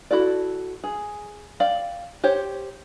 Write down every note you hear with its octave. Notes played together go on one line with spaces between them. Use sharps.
E4 F#4 A4 D5
G#4
D5 F5 G5
G4 C5 C#5